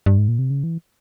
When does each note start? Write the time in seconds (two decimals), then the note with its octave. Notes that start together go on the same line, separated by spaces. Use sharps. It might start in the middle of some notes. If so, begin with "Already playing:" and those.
0.06 G2
0.18 G#2
0.28 A#2
0.39 C3
0.50 C#3
0.64 E3